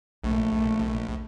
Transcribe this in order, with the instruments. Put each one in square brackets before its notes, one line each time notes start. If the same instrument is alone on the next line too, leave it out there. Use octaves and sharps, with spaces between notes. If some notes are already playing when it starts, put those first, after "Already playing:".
[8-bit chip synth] A#1 [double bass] A3